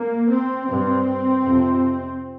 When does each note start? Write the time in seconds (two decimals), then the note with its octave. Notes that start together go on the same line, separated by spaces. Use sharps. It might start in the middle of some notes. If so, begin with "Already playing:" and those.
Already playing: A#3
0.30 C4
0.68 G2 C4
1.45 F2 C3